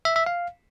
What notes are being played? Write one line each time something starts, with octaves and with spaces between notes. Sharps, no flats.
E5
E5
F5